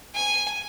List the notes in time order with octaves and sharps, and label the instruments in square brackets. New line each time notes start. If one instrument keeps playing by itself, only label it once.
[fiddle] G#5